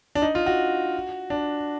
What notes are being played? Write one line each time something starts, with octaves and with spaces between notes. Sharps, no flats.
D4
D#4
F4
F#4
D4